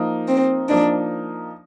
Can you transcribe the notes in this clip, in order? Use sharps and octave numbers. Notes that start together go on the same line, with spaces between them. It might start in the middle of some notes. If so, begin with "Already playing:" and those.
Already playing: F3 A#3 D#4
C4
F3 A#3 D4 D#4